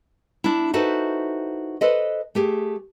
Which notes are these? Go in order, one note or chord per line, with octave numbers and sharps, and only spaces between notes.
D4 E4
D#4 E4 F#4 A4 B4 C5
A4 B4 C5 D#5
A3 G4 G#4